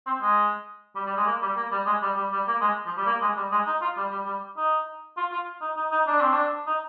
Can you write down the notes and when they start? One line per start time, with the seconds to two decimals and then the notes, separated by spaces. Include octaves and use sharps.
0.06 C4
0.22 G#3
0.96 G3
1.06 G3
1.17 G#3
1.26 A#3
1.42 G3
1.56 A#3
1.71 G3
1.86 G#3
2.02 G3
2.16 G3
2.32 G3
2.47 A#3
2.61 G#3
2.86 F3
2.97 G3
3.06 A#3
3.21 G#3
3.37 G3
3.51 G#3
3.66 D#4
3.81 F4
3.97 G3
4.11 G3
4.26 G3
4.57 D#4
5.17 F4
5.32 F4
5.61 D#4
5.76 D#4
5.91 D#4
6.07 D4
6.20 C4
6.33 D4
6.67 D#4